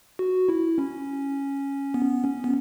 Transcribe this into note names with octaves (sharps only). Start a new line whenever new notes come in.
F#4
E4
C#4
B3
C#4
B3